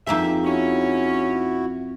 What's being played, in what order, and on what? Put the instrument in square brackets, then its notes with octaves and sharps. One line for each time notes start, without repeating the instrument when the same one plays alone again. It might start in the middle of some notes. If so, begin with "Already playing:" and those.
[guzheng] F2 A#3 C4 [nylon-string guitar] D#4 G#4 [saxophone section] E5
[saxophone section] C#4 [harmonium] E4 F#4